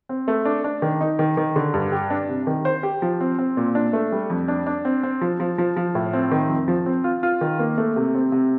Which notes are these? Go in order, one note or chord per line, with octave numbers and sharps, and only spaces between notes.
C4
A3
D4
D4
D#3
D#4
D#3
D#3
D3
G2
G4
D4
C3
D#3
C5
G4
F3
C4
C4
A#2
D4
A3
G3
F2
D4
D4
C4
C4
F3
F3
F3
F3
A2
C4
D#3
F2
F3
C4
F4
F4
D#3
A#3
A3
C3
C4
C3